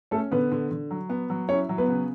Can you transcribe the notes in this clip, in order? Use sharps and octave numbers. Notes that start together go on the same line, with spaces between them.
A3 C#4 A4
D3 B3 B4
D3
D3
F#3
B3
F#3
C#4 E4 C#5
F#3
B3 B4
C#3